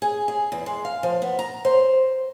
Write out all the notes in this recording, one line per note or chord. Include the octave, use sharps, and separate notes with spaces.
G#4
G#4
E2
G#3
F5
F3
B3
A#5
C5